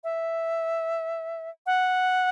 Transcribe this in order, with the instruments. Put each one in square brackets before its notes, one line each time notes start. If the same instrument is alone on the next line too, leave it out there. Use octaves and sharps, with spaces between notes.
[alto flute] E5
F#5